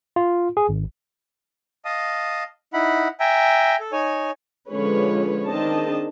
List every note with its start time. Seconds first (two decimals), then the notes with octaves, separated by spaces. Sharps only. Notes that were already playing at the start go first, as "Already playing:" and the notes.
0.16 F4
0.57 G#4
0.69 G#1
1.85 D#5 F5 A5 D#6
2.73 D#4 E4 F#5 B5
3.20 E5 G5 G#5 A#5
3.80 A4
3.92 D#4 C#5 G#5
4.70 D3 F3 G#3 C#4 B4 C#5
5.47 D#3 C4 D4 G#4 D#5 A5